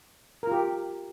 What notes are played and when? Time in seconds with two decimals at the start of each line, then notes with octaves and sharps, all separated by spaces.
0.43 A#4
0.47 F4
0.52 G4